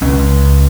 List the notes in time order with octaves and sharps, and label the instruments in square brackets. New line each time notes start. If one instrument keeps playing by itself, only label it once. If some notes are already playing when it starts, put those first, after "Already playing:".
[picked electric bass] C#2 C#3 C#4